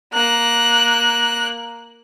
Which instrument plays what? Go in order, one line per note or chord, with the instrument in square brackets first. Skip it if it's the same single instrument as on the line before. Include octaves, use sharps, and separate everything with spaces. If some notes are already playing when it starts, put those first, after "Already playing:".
[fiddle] A#3 F#6